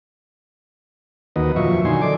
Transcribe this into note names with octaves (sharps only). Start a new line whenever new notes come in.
D#2 D#3 A#3 F#4 B4 D#5
F2 A#2 F3 F#3 E5 C#6
D3 D#3 F#3 D#4 G#5 C6
A4 D5 D6